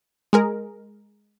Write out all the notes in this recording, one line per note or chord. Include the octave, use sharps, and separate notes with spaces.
G#3 G#4 A#4